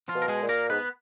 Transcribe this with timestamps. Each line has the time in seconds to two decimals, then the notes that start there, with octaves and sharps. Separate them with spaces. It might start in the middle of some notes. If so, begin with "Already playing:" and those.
0.08 F3 F4
0.15 B2
0.22 A#4
0.28 G#3 G#4
0.43 A#2
0.49 A#3 A#4
0.70 G#2 B3 B4